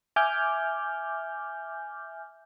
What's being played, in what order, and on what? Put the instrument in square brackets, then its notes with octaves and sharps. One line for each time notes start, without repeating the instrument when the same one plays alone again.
[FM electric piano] E5 G#5 D6 F6 G6